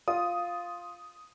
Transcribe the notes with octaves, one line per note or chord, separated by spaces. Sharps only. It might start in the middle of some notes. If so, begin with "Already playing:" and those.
F4 D#6